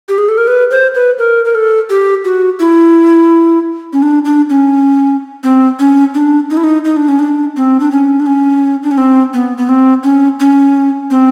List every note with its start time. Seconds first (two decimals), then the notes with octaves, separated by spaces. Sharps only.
0.09 G4
0.18 G#4
0.28 A4
0.38 A#4
0.47 B4
0.71 C5
0.95 B4
1.18 A#4
1.45 A#4
1.55 A4
1.90 G4
2.25 F#4
2.60 E4
3.93 C#4
4.02 D4
4.25 D4
4.50 C#4
5.44 C4
5.79 C#4
6.15 D4
6.50 D#4
6.57 E4
6.64 D#4
6.85 D#4
6.97 D4
7.09 C#4
7.19 D4
7.57 C4
7.80 D4
7.92 C#4
8.20 D4
8.26 C#4
8.83 D4
8.91 C#4
8.98 C4
9.34 B3
9.58 B3
9.69 C4
10.03 C#4
10.40 C#4
11.11 C4